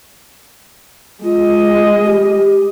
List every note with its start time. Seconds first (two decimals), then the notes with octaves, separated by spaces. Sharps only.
1.24 G#3 F4 D#5
2.04 G4